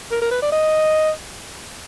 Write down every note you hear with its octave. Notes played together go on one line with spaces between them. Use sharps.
A#4
A#4
B4
D5
D#5